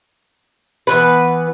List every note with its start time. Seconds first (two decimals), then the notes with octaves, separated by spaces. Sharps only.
0.87 E3 B3 B4